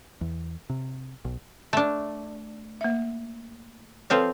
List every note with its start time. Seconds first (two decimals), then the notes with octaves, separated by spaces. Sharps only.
0.21 E2
0.70 C3
1.25 B1
1.73 A3 D4
2.81 A#3 E5
4.10 F3 C4 A4 B4 C#5 F5